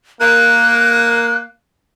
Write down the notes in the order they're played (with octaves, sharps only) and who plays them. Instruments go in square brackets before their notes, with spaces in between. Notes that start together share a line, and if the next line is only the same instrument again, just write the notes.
[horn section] A#3 [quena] F#6